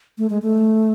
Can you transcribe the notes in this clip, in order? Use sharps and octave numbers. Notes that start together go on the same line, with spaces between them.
A3
G#3
A3